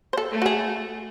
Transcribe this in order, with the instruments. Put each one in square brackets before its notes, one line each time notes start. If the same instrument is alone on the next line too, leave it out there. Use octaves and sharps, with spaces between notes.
[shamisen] C5
A4
[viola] A3
[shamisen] F#4
G#4